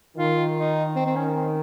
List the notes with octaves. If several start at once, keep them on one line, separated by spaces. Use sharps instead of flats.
D#3 F4
D#4
C4
C4
C#4
C4